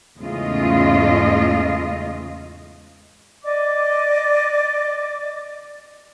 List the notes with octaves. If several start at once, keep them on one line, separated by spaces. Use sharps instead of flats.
E2 G#2 C#3 A3 F4 D#5
D5 D#5 D6